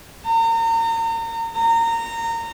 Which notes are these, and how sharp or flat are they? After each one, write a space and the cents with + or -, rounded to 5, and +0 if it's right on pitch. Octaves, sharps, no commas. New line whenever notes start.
A#5 -35
A#5 -20